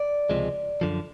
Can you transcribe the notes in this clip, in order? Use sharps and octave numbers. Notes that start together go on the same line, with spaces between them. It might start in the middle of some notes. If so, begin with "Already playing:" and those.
Already playing: D5
C#2 C3 F3 G#3
F#2 D3 F3